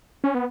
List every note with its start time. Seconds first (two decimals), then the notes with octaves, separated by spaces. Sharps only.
0.24 C#4
0.34 B3